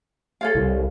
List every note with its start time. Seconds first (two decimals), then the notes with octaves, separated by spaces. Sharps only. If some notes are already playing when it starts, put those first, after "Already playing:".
0.41 A4 C#5 F5
0.55 C2